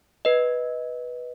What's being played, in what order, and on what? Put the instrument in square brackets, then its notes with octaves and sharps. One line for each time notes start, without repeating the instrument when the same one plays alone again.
[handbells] B4 D#5